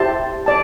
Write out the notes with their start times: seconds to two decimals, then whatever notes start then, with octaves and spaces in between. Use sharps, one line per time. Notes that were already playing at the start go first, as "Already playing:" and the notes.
Already playing: E4 G4 C5 A5
0.46 D5 A5